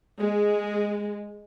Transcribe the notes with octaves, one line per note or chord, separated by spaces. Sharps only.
G#3